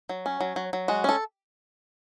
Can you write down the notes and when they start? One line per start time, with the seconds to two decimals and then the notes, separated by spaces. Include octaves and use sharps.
0.09 F#3
0.26 C#4
0.40 F#3
0.56 F#3
0.73 F#3
0.88 G#3 F#4
1.04 C#4 A4